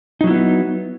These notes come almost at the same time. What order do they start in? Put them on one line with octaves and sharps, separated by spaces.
D#4 F#3 E4 B3